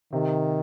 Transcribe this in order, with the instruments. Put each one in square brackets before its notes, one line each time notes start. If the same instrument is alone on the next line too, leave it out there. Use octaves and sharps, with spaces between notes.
[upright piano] C3 [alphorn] D#3